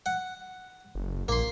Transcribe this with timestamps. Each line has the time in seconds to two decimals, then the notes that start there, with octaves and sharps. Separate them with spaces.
0.06 F#5
0.95 F#1
1.28 A#1 A#3 C6